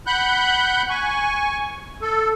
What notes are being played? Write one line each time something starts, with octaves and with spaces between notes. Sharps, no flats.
F#5 B5 F#6 G6
G#5 C#6
A4